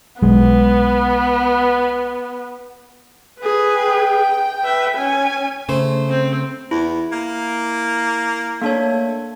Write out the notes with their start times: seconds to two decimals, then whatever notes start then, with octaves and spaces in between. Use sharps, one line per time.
0.22 B1 G#3 B3
3.40 G#4 B4
3.77 G5
4.63 B4 E5
4.97 C#4 G#5
5.69 C#3 A3 C5
6.09 C4
6.71 E2 E4
7.12 A#3
8.62 A3 A#3 D4 C#5